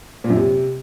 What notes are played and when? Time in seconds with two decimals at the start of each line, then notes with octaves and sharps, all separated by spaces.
0.24 A#2
0.30 F#2
0.35 C3